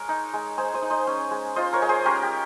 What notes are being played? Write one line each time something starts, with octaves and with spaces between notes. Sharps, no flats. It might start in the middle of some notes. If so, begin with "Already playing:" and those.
Already playing: G#3 A#4 C#5
D#4
G#3
G#3 G#4 C5
C5 D#5
D#4
C5 D#5
C#4
G#3
F4 C5 D#5
A#4 C#5
G#3
G#4 C5
C#4 G4 A#4
G4